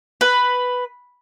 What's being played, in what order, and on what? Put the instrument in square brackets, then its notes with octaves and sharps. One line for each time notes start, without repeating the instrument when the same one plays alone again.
[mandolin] B4